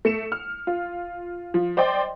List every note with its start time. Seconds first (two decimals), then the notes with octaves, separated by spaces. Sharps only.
0.05 A3 C#7 E7
0.32 F6
0.67 F4
1.54 F3
1.77 C5 D5 D#5 G5 C6